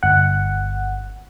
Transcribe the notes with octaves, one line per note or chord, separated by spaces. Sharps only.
G1 F#5